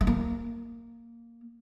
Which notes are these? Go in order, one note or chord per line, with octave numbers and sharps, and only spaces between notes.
G#3
A#3